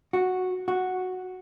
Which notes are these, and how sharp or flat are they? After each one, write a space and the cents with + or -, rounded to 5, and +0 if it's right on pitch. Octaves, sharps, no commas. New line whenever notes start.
F#4 -5
F#4 -5